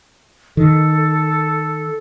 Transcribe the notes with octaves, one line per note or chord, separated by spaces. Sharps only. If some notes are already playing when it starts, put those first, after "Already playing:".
D#3 A4